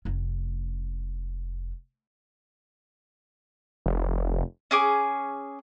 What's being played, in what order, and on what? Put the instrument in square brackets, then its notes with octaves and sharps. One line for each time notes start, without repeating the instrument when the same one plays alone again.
[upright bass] F1 C#4
[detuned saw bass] F1
[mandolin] C#4 G#4 D6